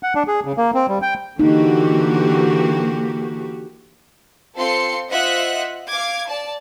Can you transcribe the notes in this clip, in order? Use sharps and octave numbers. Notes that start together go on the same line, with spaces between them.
F#5
D4
G#4
C#3
A#3
C4
G3
G5
D3 E3 A#3 D#4 F#4 G4
C4 F4 A4 C6 C#7
F4 C5 D#5 E5 F#5 F#6
F5 D6 G#6
D5 A5